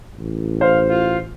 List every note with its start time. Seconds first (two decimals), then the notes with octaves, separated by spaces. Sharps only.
0.16 A1
0.61 C5 F5
0.90 F4